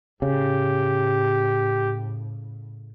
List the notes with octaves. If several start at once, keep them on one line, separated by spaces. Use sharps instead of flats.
A2 C#3 G4